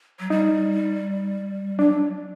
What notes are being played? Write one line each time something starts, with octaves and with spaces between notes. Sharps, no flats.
F#3
G3 D#4
F#3 D4